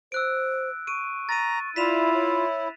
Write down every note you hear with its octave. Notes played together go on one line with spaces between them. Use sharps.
C5 E6 F#6 D7
C#6 D7 D#7
A#5 A6 D#7
E4 F4 D5 B6 E7 F7
C#5